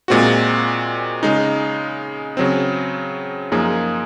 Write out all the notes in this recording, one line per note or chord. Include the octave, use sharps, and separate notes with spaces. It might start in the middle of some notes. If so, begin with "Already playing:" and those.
A#2 G#3 C4 F#4
C#3 G#3 D#4
C#3 F#3 C4
F#2 F3 A#3 D#4 G#4